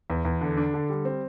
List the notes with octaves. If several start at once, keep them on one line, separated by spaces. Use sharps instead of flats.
E2
E2
D3
D4
D3
G3
C4